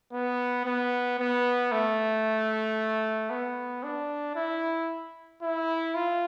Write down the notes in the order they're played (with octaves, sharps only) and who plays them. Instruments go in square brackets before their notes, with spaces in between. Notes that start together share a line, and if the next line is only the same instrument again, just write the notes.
[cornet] B3
B3
B3
A3
B3
D4
E4
E4
F4